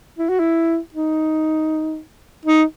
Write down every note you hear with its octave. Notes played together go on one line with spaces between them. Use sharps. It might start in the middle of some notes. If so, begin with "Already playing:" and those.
E4
F#4
E4
D#4
D#4